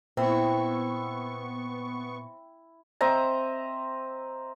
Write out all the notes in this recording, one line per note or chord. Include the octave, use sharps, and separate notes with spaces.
A#2 B3 C4 E4 C#6
C4 D#5 E5 A#5